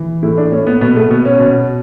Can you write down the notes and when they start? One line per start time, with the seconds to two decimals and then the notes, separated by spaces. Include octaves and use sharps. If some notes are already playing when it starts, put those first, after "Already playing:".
Already playing: E3
0.23 A2 E4
0.37 D4
0.52 A2 C#4
0.67 B3
0.81 B2 B3
0.96 A3
1.10 B2 B3
1.25 C#4
1.40 B2